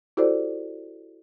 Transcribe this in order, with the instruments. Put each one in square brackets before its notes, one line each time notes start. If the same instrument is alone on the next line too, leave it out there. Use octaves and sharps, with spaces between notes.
[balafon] E4 F#4 G4 A4 C5 D5